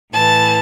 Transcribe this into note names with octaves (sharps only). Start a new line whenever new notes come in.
A2 E3 A5